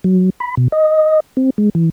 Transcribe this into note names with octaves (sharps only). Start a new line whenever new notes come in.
F#3
B5
B2
D#5
C4
G#3
E3